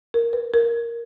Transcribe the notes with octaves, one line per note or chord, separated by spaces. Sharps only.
A#4
B4
A#4